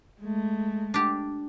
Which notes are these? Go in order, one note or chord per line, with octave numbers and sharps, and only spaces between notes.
G#3 A3
D4 G4